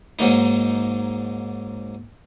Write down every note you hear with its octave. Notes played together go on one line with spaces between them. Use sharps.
G#2 F#3 A#3 D#4